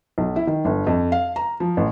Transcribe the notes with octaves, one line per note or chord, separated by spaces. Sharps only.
B1
E4
D#3
G1
F2
F5
A#5
F3
A1